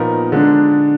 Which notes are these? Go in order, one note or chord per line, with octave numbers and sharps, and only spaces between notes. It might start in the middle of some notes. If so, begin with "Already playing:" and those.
Already playing: A#2 F3 B3 D#4 A#4
D3 G#3 D4